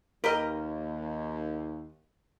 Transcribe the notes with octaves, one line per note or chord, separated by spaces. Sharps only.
D#2 G4 A#4 B4 D#5